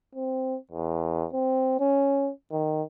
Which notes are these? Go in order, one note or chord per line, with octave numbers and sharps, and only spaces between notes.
C4
E2
C4
C#4
D#3